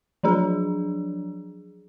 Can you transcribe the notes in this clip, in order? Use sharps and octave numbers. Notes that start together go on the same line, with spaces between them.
F3 F#3 D4 G#4